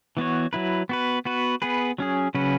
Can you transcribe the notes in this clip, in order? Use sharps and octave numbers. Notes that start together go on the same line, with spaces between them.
E3 B3 F#4 C#5
F#3 E4 B4
B3 F#4 B4
B3 F#4 B4
B3 G#4 B4
F#3 C#4 G#4
C#3 F#3 C#4 F#4 B4